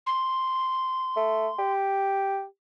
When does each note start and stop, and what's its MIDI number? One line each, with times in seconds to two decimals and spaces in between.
0.06 1.72 84
1.16 1.48 57
1.59 2.44 67